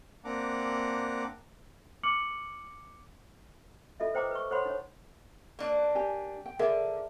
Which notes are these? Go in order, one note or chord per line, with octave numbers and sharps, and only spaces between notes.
A#3 C4 D4 F#5 A#5 D6
D6 F6 C#7 F#7
F4 A4 D#5 E5
B4 C5 G5 A#5 D6 D#6
B4 C#6
A4 C5 C#5 F#5 B5 C6
D#4 C#5
A#3 D4
G4 G#5
G5
D3 G#4 A#4 E5